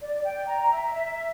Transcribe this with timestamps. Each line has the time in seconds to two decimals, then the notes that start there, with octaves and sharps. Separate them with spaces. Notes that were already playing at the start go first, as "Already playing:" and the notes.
0.01 D5
0.23 G5
0.48 A#5
0.71 E5
0.94 E5